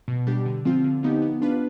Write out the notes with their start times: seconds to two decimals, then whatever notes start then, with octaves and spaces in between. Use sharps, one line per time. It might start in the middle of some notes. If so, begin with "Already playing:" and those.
0.08 B2
0.27 G3 D4 G4
0.46 D3
0.65 F3 C4 F4
0.84 D3
1.03 F3 B3 D#4 G4
1.22 B3
1.42 D4 F4 B4